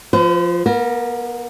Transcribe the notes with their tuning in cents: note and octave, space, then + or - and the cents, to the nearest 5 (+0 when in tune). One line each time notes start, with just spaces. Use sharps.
F3 +0 B4 +45
B3 -40 A#4 -10